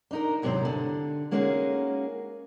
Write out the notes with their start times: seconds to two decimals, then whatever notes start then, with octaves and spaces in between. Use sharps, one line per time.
0.11 D4 D#4 A#4
0.42 D#2 G#2 C3 F#3 E4 C5
0.65 D3
1.31 G#3 A#3 C#4 D#4 F#4 G#4